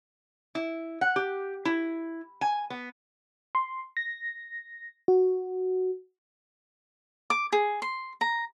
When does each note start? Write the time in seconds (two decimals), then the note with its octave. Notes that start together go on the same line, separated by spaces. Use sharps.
0.55 E4
1.01 F#5
1.16 G4
1.65 E4
2.41 G#5
2.70 B3
3.55 C6
3.97 A#6
5.08 F#4
7.30 D6
7.52 G#4
7.82 C6
8.21 A#5